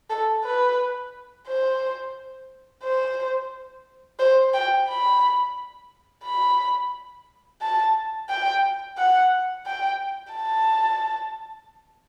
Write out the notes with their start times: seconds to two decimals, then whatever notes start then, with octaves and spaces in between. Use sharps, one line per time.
0.10 A4
0.44 B4
1.47 C5
2.83 C5
4.19 C5
4.54 G5
4.89 B5
6.24 B5
7.62 A5
8.29 G5
8.97 F#5
9.66 G5
10.33 A5